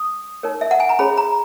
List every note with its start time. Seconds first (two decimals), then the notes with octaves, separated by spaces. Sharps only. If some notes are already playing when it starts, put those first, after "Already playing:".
Already playing: D#6
0.43 D#4 A#4 C#5
0.61 E5
0.71 F#5
0.80 G#5
0.89 A#5
0.99 C#4 G#4 C#5 B5
1.17 A#5